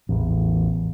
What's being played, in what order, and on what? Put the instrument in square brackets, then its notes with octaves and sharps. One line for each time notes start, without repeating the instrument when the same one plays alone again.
[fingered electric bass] A1 E2